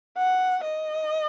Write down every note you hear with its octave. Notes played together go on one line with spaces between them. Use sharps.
F#5
D#5